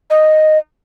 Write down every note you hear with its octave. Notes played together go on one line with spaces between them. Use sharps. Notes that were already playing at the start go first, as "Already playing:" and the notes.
D#5